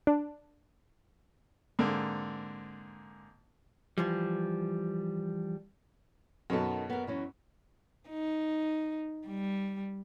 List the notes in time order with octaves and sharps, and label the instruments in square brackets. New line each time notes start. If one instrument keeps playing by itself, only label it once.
[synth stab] D4
[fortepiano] G#2 D3 A#3 C4
[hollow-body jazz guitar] E3 F3 G3
[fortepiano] F#2 B2 [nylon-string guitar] D#3 B3 A4
[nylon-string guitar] B3 A#4
E3 F#3 C#4
[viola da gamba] D#4
G3